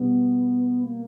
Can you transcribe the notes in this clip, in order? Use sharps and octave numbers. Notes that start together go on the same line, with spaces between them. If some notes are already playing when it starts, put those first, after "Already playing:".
Already playing: B2 G3 B3
A#3